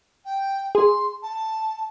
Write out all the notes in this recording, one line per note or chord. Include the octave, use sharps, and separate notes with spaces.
G5
G#4 C6
A5